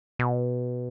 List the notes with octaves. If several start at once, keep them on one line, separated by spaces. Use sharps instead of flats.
B2